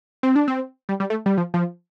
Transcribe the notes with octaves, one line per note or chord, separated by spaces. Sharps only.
C4
D4
C4
G3
G3
A3
G3
F3
F3